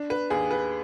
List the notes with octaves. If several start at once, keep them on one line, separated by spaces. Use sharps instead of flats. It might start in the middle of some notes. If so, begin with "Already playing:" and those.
Already playing: D4
B4
D#2 G#4
B4